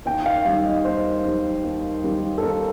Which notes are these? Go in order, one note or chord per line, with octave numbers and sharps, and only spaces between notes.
D#2 G5
F5
D#3 G3 F5
D#5
D#2 C5
D#3 G3
D#2
D#3 G3
A4
D#2 A#4